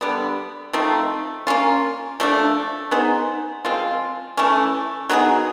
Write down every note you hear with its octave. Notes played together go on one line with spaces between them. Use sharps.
D3 G3 B3
F3 A3 C4 D#4
A#3 C#4 F4
F3 A3 D4
B3 D#4 G#4 C5
F3 G#3 C4 F4
E3 A3 C#4
F#3 B3 D#4 G#4